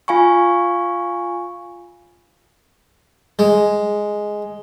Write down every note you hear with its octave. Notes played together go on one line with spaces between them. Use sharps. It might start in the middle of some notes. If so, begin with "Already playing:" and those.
F4 F5 G#5 B5 C#6
G#3